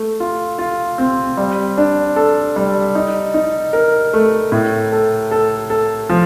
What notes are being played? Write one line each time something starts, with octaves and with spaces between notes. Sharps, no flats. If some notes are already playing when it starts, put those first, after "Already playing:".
Already playing: A3
F4
F4
C4
G3
D4
A4
G3
D#4
D#4
A#4
A3
A2
A4
A4
A4
F3